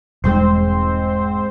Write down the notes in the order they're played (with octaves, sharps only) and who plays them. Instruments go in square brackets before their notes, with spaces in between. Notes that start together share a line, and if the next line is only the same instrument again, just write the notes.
[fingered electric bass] E1 G3 G#3 [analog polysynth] G#2 C4 C5